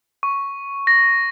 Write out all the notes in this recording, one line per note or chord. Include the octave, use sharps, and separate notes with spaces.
C#6
A#6